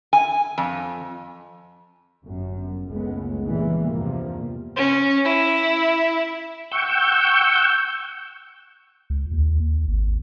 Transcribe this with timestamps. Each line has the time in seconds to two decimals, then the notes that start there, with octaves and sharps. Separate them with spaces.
0.13 G#5
0.58 F2
2.25 G1 F#2
2.88 F#1 C#2 C#3 G#3 A3 B3
3.45 A#2 E3 G3 G#3
3.89 E2 G2 C3 F3 A#3
4.76 C#4
5.24 E4
6.72 F#5 G5 C#6 E6 G6
9.10 C#2
9.32 D#2
9.60 D#2
9.88 G#1